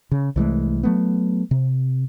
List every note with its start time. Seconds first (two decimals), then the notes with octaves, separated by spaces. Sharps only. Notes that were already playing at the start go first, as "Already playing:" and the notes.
0.11 C#3
0.36 C2 E3 G#3 A3
0.83 F#3 A3 B3
1.51 C3